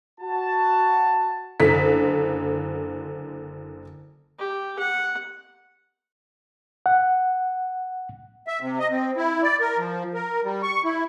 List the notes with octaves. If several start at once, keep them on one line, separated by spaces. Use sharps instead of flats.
F#4 A5
F#1 D3 B6
G4
F#5
F#5
E5
C3
D#5
C4
E4
D5
A#4
F3
A#4
G3
C#6
E4